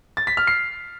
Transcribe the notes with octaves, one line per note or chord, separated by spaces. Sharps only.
A6
B6
F6
C7